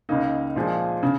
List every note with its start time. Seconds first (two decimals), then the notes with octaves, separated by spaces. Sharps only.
0.09 C#2 C#3 A#3 D#4
0.56 A#2 F3 G#3
1.03 C#3